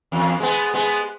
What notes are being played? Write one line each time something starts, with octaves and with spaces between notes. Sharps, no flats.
E2
G#3 B3
G#3 B3